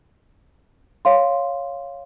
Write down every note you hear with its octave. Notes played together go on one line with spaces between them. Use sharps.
C#5 F5 C6